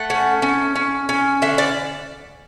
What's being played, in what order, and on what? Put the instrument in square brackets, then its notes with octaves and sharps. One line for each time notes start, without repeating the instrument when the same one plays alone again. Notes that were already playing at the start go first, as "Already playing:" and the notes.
Already playing: [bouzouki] A3 F#5
C#4
C#4
C#4
C#4
D3 E5
D5